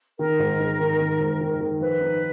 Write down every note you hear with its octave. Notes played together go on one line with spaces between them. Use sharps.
D#3 A#4
G#2
G#2
D#3
D#3
G#2
D#3
D#3
F3 B4
D#4